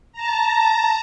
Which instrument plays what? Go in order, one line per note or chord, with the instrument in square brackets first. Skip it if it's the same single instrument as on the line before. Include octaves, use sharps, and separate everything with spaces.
[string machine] A5 A#5